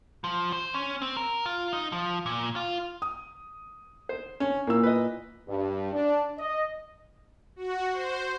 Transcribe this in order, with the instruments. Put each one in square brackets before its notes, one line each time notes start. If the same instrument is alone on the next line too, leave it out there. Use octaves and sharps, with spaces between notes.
[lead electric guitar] F3
C5
C#4
C4
A#4
F4
D#4
F3
A#2
F4
[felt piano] D#6
[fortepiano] C5
C#4
[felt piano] A#2 E4 E6 [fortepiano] A#3
[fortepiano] B4 D#5
[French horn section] G2
D4
D#5
[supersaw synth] F#4
C5